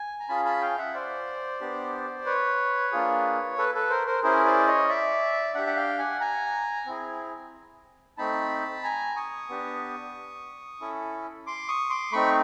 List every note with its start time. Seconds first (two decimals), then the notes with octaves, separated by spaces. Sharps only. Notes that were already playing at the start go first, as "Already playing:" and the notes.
Already playing: G#5
0.20 A#5
0.29 C#4 F4 G#4 A5 B5
0.45 A5 B5
0.61 F5 G5
0.78 E5 F#5
0.94 C5 D5
1.61 B3 D4 G4
2.26 B4 C#5
2.92 A#3 D4 F4 G#4
3.58 A4 B4
3.74 A4 B4
3.90 A#4 C5
4.07 A#4 C5
4.23 C#4 E4 G#4 A#4 C5
4.46 C5 D5
4.67 C#5 D#5
4.89 D5 E5
5.54 D4 G4 E5 F#5
5.67 F#5
5.76 F5 G5
5.99 F#5 G#5
6.20 G#5 A#5
6.86 C4 E4 G#4
8.17 A3 C4 D#4 A5 B5
8.83 G#5 A#5
9.16 C#6 D#6
9.49 B3 D4 G4
10.81 C#4 E4 A4
11.47 C6 D6
11.68 C#6 D#6
11.90 C6 D6
12.12 A3 C4 D#4 B5 C#6